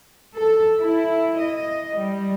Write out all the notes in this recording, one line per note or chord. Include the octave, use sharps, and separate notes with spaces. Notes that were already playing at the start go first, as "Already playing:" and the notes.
A4
E4
D#5
G3